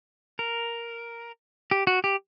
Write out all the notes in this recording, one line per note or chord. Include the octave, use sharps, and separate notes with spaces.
A#4
G4
F#4
G4